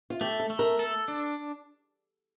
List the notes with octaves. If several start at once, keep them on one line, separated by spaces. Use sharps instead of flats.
F4
A3 G4
A4
A3
A#4
A4
D4